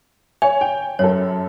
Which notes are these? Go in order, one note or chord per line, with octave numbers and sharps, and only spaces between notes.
C#5 G#5
G5
F#2 A4 C#5